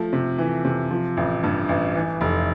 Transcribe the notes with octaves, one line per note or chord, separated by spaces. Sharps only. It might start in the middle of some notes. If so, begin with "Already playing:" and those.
Already playing: F3 A3
C3
E3
C3
F3
A1
G2
A1
E3
F1